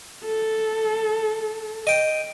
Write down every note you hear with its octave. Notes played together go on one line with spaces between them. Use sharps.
A4
D#5 G5